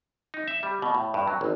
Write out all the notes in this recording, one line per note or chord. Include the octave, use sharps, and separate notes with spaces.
D#4
E5
G3
B2
A2
G2
F#3
G#1